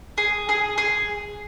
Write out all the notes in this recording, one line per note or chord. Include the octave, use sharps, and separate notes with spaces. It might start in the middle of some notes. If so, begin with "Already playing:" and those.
G#4
G#4
G#4